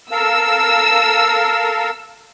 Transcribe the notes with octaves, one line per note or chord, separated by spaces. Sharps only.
A4 A#4 F5 E6